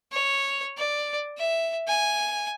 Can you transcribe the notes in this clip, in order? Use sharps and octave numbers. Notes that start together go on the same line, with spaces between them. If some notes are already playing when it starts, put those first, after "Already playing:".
C#5
D5
E5
G#5